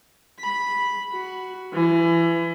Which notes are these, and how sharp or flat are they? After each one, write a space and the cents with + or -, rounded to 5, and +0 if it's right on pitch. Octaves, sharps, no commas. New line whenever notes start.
B5 -5
F#4 +10
E3 +25